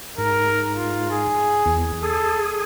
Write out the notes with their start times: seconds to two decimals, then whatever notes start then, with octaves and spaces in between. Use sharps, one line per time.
0.18 G#2 A#4
0.76 F4
1.11 G#4
1.66 E2
2.03 G#4 A4